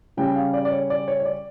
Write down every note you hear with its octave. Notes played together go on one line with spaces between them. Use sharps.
C#3 G3 C#4 G5
F5
D5
D5
C#5
D5
C#5
C#5
D5